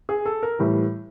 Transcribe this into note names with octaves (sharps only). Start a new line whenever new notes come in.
G#4
A4
A#4
A2 E3 G3